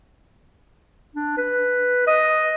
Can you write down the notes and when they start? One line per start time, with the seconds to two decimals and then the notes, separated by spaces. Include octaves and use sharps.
1.15 D4
1.37 B4
2.07 D#5